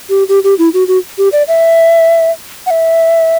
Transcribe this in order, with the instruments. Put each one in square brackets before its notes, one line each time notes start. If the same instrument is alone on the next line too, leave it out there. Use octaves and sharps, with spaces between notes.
[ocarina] G4
G4
G4
E4
F#4
F#4
G4
D5
E5
F#5
E5